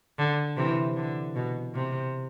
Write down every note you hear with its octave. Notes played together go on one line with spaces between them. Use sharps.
D3
C3 E3
D3
B2
C3